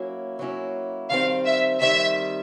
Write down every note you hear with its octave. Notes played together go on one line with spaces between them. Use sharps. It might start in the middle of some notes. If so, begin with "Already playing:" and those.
Already playing: F#3 A#3 C#4 E4
F#3 A#3 C#4 E4
D#3 G3 C4 F5
E5
D#3 G3 C4 E5